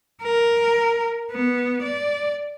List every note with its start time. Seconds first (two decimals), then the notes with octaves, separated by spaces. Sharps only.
0.23 A#4
1.31 B3
1.82 D5